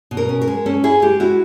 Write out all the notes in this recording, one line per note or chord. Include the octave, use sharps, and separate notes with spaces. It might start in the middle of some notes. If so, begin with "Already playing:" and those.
B2
A#4
C#4
A#4
G#3
C#4 A4
E4 G#4
G#3 G4
E4 F#4